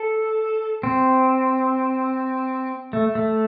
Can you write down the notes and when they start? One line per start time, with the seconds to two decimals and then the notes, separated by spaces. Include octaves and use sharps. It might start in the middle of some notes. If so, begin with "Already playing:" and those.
Already playing: A4
0.83 C4
2.93 A3
3.15 A3